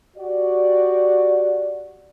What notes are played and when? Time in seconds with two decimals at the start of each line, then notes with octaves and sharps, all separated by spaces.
0.16 F#4 G4 D5